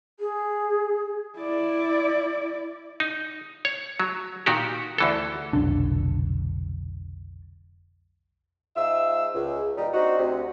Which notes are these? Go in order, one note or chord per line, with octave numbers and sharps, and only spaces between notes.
G#4
E4 D5
D#4
C#5
F#3
A#2 D#3 F#4 G4
D2 E3 A4
F1 B1 D3 D4
G#2 D#4 F4 E5 E6
C#2
A#2 D#3 G3 D#4
C4 D4 D#4 F#4
D2 C3